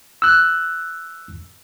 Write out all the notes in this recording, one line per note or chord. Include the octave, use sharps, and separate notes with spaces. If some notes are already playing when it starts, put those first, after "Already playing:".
E6 F#6